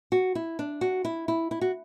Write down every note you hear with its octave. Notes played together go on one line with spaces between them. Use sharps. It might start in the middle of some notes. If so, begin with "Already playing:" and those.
F#4
E4
D4
F#4
E4
E4
E4
F#4